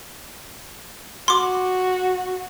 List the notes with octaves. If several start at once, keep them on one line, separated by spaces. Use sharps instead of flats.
F#4 C6 D6